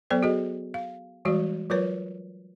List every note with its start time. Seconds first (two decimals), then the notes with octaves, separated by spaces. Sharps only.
0.10 F#3 B3 A4 C5 D5
0.23 F#4 G#4 D#5
0.74 F5
1.25 E3 G3 G#3 F#4 D5
1.70 F#3 F4 A#4 B4 C#5